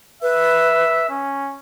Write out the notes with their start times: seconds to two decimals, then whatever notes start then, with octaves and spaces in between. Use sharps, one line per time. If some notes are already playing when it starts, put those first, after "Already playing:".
0.22 B4 E5
1.10 C#4